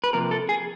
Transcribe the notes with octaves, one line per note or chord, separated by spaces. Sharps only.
B4
C3 F3 A#3 A#4
A4
G#4